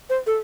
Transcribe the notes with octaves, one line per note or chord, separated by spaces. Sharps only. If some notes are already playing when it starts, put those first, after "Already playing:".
C5
A4